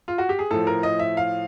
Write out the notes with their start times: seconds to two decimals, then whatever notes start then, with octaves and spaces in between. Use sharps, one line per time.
0.08 F4
0.18 F#4
0.29 G4
0.39 G#4
0.51 A2 F3 A4
0.67 A#4
0.83 D#5
0.99 E5
1.17 F5